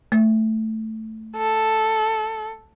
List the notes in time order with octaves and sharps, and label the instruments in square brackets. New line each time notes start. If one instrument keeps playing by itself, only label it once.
[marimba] A3
[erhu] A4